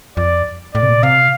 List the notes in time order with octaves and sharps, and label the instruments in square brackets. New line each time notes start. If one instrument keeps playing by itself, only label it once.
[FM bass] F2 [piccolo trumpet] D5
[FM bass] A2 [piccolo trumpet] D5
[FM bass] C3
A#2
[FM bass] C3 [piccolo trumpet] F5